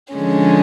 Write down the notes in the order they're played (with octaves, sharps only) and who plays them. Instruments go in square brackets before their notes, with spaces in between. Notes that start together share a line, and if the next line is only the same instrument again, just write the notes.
[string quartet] D3 F3 G#3 C#4